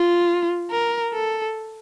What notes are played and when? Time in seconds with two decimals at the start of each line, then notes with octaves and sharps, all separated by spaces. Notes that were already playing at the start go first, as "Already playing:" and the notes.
Already playing: F4
0.71 A#4
1.14 A4